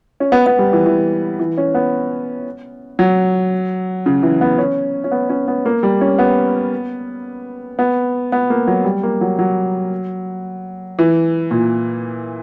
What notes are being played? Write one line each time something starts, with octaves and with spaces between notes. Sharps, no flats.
C#4
B3
B3
G3
E3
E3
E3
C#4
B3
F#3
C#3
E3
B3
C#4
C#4
B3
C#4
B3
A#3
G3
C#4
B3
B3
B3
A#3
F#3
G3
A#3
F#3
F#3
E3
A#2